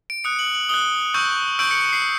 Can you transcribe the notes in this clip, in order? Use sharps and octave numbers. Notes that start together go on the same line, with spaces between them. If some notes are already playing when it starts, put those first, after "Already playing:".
D7
D#6 F#6 C#7
F#7
F#7
D#6 F#6 G7
C#6 E6 G6
C#6 E6 G6 D7
C#7
C#7
C7